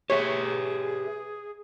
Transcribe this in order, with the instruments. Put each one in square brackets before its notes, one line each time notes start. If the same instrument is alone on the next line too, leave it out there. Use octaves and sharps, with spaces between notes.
[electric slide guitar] G4 B4 E5 [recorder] G#4 [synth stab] C#5